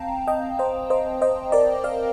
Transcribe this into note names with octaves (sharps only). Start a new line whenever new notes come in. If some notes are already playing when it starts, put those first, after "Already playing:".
Already playing: C4 F5 G5 A5 A#5
D#5 G5
C5 D#5
C5 D#5
C5 D#5
A#4 D5
D5 F5